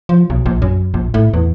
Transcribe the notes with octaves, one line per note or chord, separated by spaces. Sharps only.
F3
B1
A#1
F#2
A#1
A2
E2